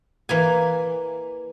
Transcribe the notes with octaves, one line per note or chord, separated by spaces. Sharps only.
E3 A#3 G#5